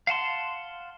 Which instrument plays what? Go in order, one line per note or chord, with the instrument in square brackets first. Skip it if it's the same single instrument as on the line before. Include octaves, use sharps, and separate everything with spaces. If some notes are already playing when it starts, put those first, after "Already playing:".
[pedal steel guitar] F5 F#5 A5 C6